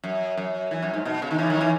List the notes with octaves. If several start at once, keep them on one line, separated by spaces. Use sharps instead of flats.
F#2
F#2
E3
F#2
G#2
B2
C#3
D#3
C#3 E3
D#3 F#3
C#3 E3